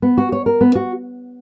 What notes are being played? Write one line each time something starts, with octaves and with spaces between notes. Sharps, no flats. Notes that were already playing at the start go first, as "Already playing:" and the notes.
B3
F#4
C#5
A#4
B3
F#4